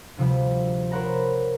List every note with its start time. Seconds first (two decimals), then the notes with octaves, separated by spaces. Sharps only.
0.17 D2 C3 F3 G3
0.91 A#4 C5 C#5 F#5 A#5 B5